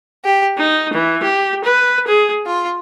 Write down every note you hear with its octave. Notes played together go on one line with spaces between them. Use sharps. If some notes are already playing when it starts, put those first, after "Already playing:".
G4
D#4
E3
G4
B4
G#4
F4